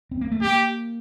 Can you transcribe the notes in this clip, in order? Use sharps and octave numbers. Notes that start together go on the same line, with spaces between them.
C4
A#3
A3
A#3 G4